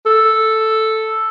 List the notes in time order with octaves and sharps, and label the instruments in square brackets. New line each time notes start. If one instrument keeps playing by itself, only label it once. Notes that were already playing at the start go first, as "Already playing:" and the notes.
[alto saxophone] A4